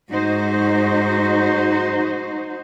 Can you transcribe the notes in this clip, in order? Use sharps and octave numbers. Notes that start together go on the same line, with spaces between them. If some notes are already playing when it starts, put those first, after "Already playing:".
G#2 D#4 F#4 C5